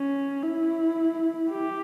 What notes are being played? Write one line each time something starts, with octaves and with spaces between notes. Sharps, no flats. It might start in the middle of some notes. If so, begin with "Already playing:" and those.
Already playing: C#4
E4
G4